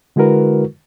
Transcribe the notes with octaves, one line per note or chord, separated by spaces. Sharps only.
D3 G#3 E4 F#4 A#4 B4